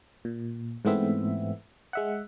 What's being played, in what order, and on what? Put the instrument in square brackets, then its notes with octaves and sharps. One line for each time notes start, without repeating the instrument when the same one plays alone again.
[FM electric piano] A#2
G#2 E3 A3 B3 C4 E5
G#3 E5 F#5